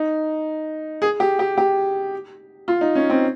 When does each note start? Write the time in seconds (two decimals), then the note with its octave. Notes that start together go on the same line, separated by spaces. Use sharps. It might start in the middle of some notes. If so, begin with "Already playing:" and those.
Already playing: D#4
1.02 G#4
1.20 G4
1.39 G4
1.58 G4
2.68 F4
2.81 D#4
2.95 C#4
3.10 C4